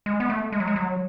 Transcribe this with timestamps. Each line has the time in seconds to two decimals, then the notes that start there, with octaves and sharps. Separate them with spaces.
0.06 G#3
0.20 B3
0.30 A3
0.52 G#3
0.60 F#3
0.67 G#3
0.76 F#3